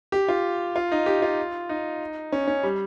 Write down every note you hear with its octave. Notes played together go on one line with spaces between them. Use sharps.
G4
F4
F4
D#4
G4
F4
D#4
C#4
C#4
G3